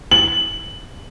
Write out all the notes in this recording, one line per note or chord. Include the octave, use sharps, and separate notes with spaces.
F#7